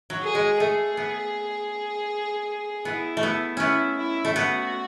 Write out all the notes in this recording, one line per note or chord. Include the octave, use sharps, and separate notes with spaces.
F#3
G#4
G#3
A3 G#4
B3
B3 E4
A3
B3
B3 C#4 E4
E4
A3
B3 F#4